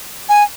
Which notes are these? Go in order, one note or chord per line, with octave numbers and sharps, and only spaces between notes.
G#5